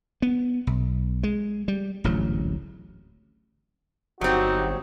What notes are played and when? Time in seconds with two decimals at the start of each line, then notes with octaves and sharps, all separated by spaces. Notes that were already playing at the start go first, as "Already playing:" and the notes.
0.22 B3
0.67 B1
1.23 G#3
1.68 G3
2.04 D1 A1 G#2 F#3
4.21 G1 F#3 C4 D#4 F#4 G4